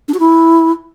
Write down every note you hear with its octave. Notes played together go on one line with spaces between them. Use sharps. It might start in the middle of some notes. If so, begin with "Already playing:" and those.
D4
F#4
E4